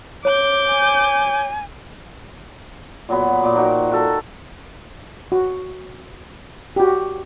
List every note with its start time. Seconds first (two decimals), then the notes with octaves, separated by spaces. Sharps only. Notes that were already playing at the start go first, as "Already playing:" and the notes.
0.25 C#5 D6 G6
0.71 G#5
3.09 A#2 F#3 B3
3.44 A#2 D6
3.55 F3 D#4 F#4 G5
3.91 F#4 A4 A#5
5.32 F#4
6.76 F#4 G4